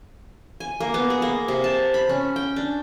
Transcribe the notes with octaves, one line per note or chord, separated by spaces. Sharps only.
G#5
A#3
B3
G#4
A#3
C3
A5
B5
C#4
G5
D4